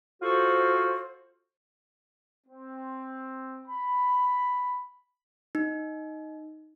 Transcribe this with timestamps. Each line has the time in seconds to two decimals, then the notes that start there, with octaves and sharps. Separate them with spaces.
0.22 F4 F#4 A4 C5
2.47 C4
3.68 B5
5.55 D#4